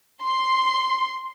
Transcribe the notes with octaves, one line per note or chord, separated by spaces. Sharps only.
C6